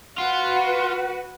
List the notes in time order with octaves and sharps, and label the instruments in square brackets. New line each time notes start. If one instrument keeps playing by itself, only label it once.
[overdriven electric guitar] F4 [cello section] F#4 B4 [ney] F#5